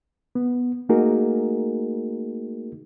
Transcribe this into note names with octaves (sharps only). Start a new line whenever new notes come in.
B3
A3 A#3 D#4 F#4 G#4 A#4